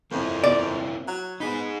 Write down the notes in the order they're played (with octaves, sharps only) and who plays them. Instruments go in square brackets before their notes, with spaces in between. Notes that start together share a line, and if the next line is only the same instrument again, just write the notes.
[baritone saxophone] F2 [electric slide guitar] A#3 C4 E4
[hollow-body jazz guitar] D5
[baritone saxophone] F#3
[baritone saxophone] B3 [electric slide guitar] D#4 G#4